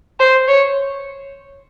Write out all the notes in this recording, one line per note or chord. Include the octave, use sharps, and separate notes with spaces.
C5
C#5